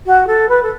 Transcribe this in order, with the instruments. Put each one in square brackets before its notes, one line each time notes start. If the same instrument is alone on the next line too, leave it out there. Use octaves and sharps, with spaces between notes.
[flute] F#4
A4
B4
A4